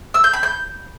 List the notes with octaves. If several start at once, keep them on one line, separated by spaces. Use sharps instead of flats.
E6
G6
B5
G6